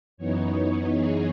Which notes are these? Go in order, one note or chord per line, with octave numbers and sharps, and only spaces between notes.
F#2 E3 B3 D#4 C#5
G#4